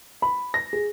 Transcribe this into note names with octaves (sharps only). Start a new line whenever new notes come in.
B5
A#6
G#4